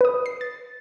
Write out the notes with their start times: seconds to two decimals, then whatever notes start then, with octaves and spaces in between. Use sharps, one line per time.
0.01 B4 D#6
0.26 C7
0.41 A6